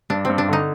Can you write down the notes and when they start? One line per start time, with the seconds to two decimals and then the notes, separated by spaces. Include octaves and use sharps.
0.10 G2 D4
0.25 G2 C4
0.38 D4
0.48 D3 D#4